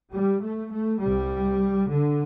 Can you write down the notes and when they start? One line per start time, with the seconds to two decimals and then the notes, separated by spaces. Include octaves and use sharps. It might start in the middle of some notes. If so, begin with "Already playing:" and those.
0.13 G3
0.42 A3
0.72 A3
1.01 C2 C3 G3
1.89 D3